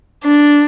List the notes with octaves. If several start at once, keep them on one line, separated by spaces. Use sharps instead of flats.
D4